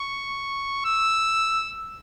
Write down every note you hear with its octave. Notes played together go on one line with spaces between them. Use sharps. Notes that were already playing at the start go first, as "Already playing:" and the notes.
Already playing: C#6
E6